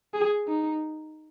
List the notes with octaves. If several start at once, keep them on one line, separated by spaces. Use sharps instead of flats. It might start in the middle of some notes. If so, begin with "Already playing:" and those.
G#4
D#4